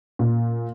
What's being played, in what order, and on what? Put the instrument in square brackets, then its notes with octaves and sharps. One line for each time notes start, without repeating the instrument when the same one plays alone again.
[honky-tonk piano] A#2